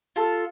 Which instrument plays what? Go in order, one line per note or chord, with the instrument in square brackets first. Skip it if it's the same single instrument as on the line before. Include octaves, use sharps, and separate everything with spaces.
[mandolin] F4 A4